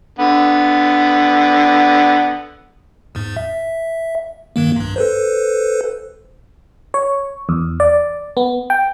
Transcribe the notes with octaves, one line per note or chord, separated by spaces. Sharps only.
D3 B3
E2 G#2
E5
G2 D#3 A#3
B1 G2
A4 B4 C5
C#5
E2
D5
B3
G5